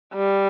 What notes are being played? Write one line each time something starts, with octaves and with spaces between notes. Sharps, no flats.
G3